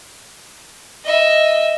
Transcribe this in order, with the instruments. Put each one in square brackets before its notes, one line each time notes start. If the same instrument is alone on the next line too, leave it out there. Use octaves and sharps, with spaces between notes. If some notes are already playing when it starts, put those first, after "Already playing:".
[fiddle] D#5 E5